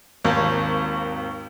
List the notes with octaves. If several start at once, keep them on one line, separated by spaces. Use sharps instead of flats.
G#1 D#2